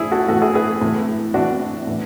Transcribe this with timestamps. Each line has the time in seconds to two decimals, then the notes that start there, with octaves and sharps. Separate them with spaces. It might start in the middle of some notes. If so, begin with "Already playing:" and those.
Already playing: A2 E3 D4 E4 G#4
0.12 F#4 A4
0.29 A2 E3 F#4 A4
0.42 E4 G#4
0.55 G#4 B4
0.81 A2 E3
1.34 A2 E3 D4 F#4
1.87 A2 E3